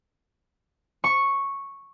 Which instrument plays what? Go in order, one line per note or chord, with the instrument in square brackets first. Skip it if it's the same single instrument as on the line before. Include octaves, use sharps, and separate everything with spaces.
[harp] C#6